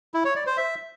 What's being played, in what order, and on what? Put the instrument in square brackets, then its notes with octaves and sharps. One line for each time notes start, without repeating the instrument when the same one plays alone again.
[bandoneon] E4
C#5
D5
C5
E5